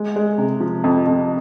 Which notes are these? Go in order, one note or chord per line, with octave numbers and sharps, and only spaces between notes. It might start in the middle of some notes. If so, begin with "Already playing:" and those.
Already playing: G#3
G#3
C3
F3
F2
F2